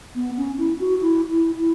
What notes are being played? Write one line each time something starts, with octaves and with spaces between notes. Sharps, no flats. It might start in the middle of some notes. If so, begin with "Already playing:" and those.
B3
C#4
E4
F#4
E4
E4
E4